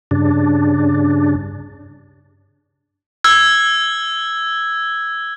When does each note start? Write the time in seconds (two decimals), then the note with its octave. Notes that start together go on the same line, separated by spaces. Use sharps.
0.11 G2 C#3 D4
3.24 E6 F6 G#6